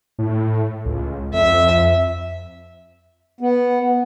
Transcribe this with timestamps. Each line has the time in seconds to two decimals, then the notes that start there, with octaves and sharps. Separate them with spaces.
0.19 A2
0.85 C#2
1.33 F2 E5
3.41 B3